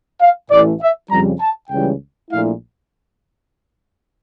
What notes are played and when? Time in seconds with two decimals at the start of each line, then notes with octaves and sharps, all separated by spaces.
0.21 F5
0.51 A1 A2 E3 A3 E4 D5
0.81 E5
1.10 F2 C#3 G3 A#5
1.40 A5
1.70 C#2 C#3 E3 G3 G5
2.31 A#1 A#2 A3 E4 F5